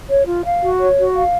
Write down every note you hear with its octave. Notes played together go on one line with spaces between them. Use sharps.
C#5
F4
F5
F#4
C#5
F#4
F5